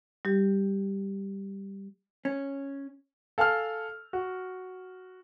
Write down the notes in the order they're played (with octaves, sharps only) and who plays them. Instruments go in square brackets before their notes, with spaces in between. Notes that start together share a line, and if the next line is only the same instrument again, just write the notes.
[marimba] G3 G4
[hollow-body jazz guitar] C#4
[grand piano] A4 F5 G#5 A5 F6
F#4